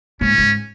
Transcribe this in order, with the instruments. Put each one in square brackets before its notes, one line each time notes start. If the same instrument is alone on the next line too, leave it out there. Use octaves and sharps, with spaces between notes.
[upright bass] G#2 [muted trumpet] C#4
[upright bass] G#2